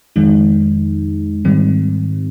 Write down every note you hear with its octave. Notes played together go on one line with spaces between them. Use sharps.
F2 D#3 G#3 D#4
G#2 D#3 G3 C4